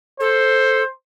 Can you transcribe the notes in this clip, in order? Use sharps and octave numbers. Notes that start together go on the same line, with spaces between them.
A4 C5